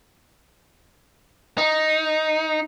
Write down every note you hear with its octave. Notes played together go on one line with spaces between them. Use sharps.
D#4